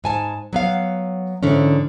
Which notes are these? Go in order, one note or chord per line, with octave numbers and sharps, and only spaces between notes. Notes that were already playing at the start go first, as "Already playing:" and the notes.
G#2 G#5 A5
F#3 B3 F5
G#2 D3 E3 C#4